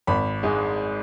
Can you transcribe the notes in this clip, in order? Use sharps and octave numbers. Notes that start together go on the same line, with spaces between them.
G#1 B5
G#2 G#3